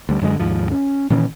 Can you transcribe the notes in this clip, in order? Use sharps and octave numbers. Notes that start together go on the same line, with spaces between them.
D2 G3
F#2 D3 E3 G#3
D#2 G#2 F3
C#4
A#2 D#3 E3 C#4